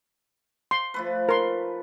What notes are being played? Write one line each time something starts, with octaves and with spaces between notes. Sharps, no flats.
C6
F3 A3 B4
A#4 C6